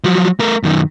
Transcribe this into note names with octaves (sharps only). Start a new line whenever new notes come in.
F3 F#3
A3 A#4
F#2 D#3